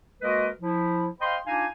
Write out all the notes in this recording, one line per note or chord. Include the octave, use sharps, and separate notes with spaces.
G#3 A#3 F#4 A#4 B4 D#5
F3 E4
C5 D#5 F5 G5 B5 C6
D4 D#4 F4 F5 G#5